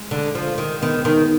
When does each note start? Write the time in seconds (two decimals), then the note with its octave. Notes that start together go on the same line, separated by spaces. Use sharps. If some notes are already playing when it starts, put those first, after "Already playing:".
Already playing: G#3
0.11 D3
0.35 F3
0.58 D#3
0.82 D#3 B3
1.05 D#3